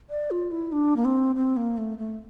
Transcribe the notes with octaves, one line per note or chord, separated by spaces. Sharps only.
D5
F4
E4
D4
A#3
C4
C4
A#3
A3
A3